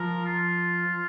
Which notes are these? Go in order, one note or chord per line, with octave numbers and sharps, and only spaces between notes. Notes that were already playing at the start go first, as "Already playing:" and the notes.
Already playing: F3 A#4
F4